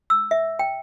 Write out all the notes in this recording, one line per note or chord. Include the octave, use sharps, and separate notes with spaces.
E6
E5
G5